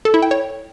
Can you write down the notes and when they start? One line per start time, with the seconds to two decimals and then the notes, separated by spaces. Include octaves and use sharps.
0.05 A4
0.14 E4
0.22 G5
0.31 C#5